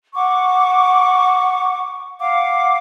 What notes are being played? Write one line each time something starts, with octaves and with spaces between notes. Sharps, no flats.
F#5 C#6 D6
F5 F#5 D6